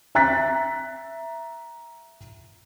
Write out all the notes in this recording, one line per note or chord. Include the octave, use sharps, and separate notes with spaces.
E5 A#5 F#6 A6 B6